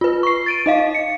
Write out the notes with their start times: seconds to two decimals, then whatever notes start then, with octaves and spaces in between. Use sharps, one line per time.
0.01 F4 B4
0.23 C#6 C7
0.46 A6 D7 D#7
0.66 D#4 D#5 F5
0.95 C#7